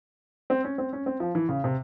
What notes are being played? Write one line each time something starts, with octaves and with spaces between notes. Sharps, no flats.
C4
C#4
C4
C#4
C4
F3
E3
C#3
C3